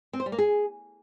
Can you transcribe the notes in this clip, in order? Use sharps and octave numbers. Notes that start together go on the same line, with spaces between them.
C4
C5
G3
A#3
G#4